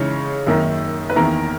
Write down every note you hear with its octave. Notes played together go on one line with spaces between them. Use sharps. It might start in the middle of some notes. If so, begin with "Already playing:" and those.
Already playing: C#3 E3 G#3 D#4 C#5
F#2 D#3 A#3 D#4
B4
E2 D#3 A#3 E4 A#4